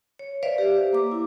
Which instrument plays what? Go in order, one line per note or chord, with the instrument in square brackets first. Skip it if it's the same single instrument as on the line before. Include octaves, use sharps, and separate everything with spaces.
[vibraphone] C#5
B4 C5 D5 E5 F5
G4
A#3 D6
E4 D6